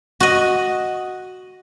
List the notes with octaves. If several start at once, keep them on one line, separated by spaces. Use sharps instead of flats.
F#4 D#5